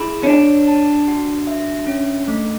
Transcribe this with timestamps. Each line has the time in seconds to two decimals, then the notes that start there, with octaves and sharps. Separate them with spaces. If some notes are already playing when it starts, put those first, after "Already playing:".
Already playing: E4 G#4
0.23 C#4
0.27 D4 C#5
0.68 A5
1.07 F#4
1.47 E5
1.87 C#4
2.28 A3